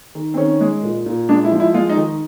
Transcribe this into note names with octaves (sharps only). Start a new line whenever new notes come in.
D#3
C4
D#3 C#4
G#3
A#2
A#2
G#3 D4
E4
F3
E4
G#3 F4
D#4
D#3